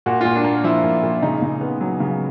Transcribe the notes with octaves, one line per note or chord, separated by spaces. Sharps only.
A#2 F#4
A#2 F4
D4
A#3
F3 E4
A#2
A#2
C#3 D#4
C#3
B3
F#3
C#3